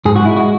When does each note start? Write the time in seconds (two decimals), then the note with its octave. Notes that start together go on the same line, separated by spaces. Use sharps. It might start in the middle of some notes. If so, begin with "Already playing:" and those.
0.05 G#2 G#4
0.16 F#4
0.25 G#3 E4
0.37 F#4